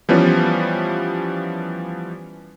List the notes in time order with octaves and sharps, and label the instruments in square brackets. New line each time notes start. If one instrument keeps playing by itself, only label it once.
[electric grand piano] E3 F3 G3 B3 C#4